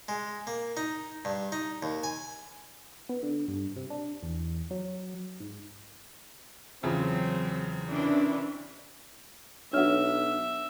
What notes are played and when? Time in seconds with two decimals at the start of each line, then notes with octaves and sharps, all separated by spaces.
0.08 G#3
0.47 A#3
0.77 D#4
1.25 G2
1.52 D#4
1.83 D#2
2.03 G#5
3.09 B3
3.23 D3
3.48 G2
3.76 C3
3.90 D4
4.23 E2
4.71 F#3
5.40 G#2
6.83 E2 C#3 F3 F#3 C4
7.88 C3 D#3 E3 C#4 D4 E4
9.73 B1 D4 F#4 C#5 E5 F6